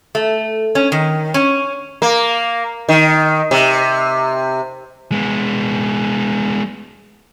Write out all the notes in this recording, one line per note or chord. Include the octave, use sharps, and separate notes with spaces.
A3
C#4
D#3
C#4
A#3
D#3
C3
G#3 B3